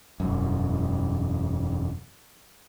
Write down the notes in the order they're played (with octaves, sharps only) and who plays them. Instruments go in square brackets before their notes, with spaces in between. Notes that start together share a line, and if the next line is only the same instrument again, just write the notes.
[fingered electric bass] E1 F#2